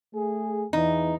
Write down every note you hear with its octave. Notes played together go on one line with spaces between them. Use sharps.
A3 G#4
E2 E3 D#4